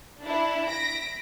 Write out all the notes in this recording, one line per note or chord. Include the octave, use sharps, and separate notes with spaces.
D4 E4
A#6 B6 D7